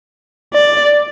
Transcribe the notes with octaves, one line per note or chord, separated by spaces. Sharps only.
D5